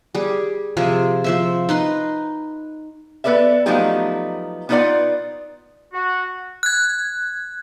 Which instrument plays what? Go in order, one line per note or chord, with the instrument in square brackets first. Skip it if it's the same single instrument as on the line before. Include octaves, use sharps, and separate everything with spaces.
[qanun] G3 G#4
C3 F3 C4 G#4
F3 C5 E5
D#4 B4 C6
[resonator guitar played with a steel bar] B3 A4 B4 D5 E5
F3 F#3 A3 B3 D#4 G4
B3 D#4 F4 B4 D5 F#5
[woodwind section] F#4
[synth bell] F#6 G#6